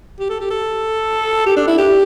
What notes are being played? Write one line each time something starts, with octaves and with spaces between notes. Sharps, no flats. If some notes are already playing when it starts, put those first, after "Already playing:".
G4
A4
G4
A4
G4
D4
E4
G4